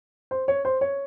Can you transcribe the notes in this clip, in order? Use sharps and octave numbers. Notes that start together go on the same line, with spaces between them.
C5
C#5
C5
C#5